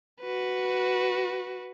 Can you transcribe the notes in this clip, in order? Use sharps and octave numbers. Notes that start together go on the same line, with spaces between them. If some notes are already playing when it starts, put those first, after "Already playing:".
F#4 B4